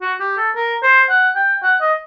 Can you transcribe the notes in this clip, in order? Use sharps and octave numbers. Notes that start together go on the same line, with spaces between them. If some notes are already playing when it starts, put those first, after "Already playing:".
F#4
G4
A4
A#4
C5
F#5
G5
F#5
D#5